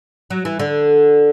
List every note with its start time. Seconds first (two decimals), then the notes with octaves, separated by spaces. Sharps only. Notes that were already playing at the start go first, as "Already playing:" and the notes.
0.30 F#3
0.45 E3
0.59 D3